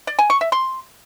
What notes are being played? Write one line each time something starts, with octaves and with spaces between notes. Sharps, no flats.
D5
G#5
C#6
E5
C6